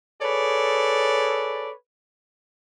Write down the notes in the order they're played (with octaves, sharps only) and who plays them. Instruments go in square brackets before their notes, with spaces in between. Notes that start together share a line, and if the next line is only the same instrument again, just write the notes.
[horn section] G#4 A4 B4 C#5 D5